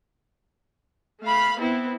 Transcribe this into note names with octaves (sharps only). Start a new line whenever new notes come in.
A3 F5 B5
B3 C4 E4